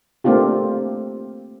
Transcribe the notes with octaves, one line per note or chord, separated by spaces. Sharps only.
A3 A#3 C4 D4 F4 G4